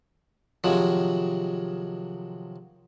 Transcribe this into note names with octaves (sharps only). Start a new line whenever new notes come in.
C3 D#3 F3 F#3 G#3